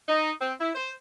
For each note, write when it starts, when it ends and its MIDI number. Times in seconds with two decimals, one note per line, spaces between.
0.07 0.31 63
0.40 0.53 60
0.59 0.70 64
0.75 0.91 72